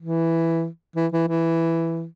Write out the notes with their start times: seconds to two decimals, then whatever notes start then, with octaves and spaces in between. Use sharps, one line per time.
0.01 E3
0.96 E3
1.13 E3
1.28 E3